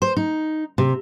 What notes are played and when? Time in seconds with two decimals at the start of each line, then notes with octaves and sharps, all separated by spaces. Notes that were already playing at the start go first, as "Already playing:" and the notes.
0.02 C5
0.17 D#4
0.78 C3